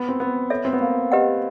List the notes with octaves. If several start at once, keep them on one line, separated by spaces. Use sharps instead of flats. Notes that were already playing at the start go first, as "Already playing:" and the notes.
Already playing: B3
C4
B3
A4 C#5 E5
C4
B3
A#3
G4 B4 D#5 F#5